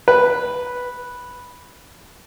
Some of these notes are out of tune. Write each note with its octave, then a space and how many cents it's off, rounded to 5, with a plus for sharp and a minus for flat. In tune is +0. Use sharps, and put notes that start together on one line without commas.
B4 -5